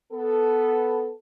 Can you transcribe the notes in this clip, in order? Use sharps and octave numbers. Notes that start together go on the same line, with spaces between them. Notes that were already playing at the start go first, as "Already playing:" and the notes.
B3 A4